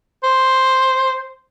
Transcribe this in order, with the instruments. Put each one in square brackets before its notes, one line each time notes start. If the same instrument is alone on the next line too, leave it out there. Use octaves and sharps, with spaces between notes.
[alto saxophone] C5